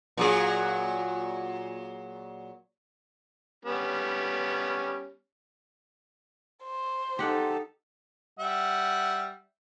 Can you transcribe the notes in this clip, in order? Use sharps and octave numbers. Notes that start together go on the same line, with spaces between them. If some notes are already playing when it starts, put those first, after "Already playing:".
A#2 F#3 G#4
G3 B3 C#4
C5
D#4 G4 A4 F#5
G3 E5 F#5